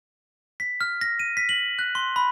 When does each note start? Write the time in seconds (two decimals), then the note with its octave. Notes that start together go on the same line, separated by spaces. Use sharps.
0.60 B6
0.81 F6
1.01 A#6
1.19 D#7
1.37 B6
1.49 F#7
1.79 F#6
1.95 C6
2.16 B5